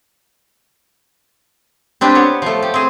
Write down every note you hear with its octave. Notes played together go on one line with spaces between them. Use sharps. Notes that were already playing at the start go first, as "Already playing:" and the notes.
C4 D4 G4 B4
B3 C#5
F3 A3
G4
C4 G#4